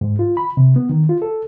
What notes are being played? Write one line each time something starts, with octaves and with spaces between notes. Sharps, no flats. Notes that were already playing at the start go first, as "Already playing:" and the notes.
G#2
F4
B5
C3
B3
D#3
F4
A4